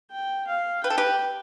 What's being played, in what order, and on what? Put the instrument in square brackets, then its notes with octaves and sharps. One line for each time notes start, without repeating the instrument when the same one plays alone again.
[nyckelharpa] G5
F5
[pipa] B4 [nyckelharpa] G5
[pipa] A4
G4 B4